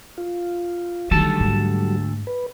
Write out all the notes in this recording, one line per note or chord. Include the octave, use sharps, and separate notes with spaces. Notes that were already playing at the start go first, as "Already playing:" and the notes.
F4
D2 D#3 F#3 G3 A4 A5
G#2
B4